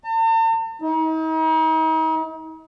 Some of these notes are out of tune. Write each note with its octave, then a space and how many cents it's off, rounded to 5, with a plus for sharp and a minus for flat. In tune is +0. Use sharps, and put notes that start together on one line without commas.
A5 +45
D#4 +40